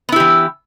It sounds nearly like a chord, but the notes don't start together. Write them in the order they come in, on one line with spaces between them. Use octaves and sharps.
B3 E4 G4 E3